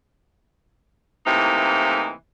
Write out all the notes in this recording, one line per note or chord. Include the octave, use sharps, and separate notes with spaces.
A2 C3 E3 A#3 D#4